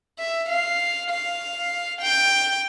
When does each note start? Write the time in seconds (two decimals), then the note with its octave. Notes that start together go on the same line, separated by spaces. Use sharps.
0.19 E5
0.49 F5
1.11 F5
2.02 G5